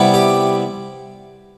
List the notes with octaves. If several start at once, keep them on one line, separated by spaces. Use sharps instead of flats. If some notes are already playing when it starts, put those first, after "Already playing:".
Already playing: C3 G3 B3 E4
G4